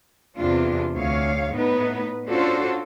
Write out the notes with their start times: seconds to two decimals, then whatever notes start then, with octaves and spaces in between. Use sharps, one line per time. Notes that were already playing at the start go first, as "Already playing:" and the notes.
0.36 E2 C3 D4 F4
0.95 D2 C#5 F5
1.52 A2 B3 D#4 B4
2.29 C#4 D4 F4 F#4 A4 C5